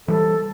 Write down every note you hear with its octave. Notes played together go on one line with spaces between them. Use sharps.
E3 G3 A4